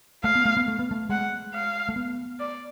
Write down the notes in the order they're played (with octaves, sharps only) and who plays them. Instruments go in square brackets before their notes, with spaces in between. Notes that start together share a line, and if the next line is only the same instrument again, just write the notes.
[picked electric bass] A3 [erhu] F5
[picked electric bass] B3
A3
B3
A3
B3
A3
[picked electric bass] G#3 [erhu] F#5
[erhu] F5
[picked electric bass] A3
B3
[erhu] D5